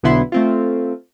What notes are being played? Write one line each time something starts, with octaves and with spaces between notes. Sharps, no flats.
B1 D3 B3 E4 C6
A3 C4 F4